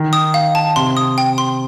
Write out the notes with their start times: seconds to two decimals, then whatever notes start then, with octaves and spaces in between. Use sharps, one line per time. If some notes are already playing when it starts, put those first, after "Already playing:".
Already playing: D#3
0.13 D#6
0.34 F5
0.55 A5
0.76 C3 C6
0.97 D#6
1.18 G5
1.38 C6